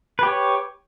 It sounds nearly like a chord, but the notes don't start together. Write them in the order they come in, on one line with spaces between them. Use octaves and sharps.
B4 G4 C#5